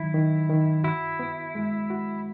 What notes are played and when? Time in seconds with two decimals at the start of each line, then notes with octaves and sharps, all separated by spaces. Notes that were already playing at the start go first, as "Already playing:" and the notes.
Already playing: D#3 F#3 E4
0.14 D#3
0.50 D#3
0.84 E4 F#4
1.19 B3
1.55 G#3
1.90 F#4